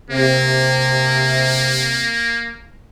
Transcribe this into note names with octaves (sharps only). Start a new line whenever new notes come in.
C3 A#3